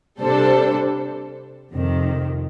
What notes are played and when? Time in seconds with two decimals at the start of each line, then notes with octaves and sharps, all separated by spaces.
0.20 C3 G3 D4 A4 C5
1.72 F2 C3 D#3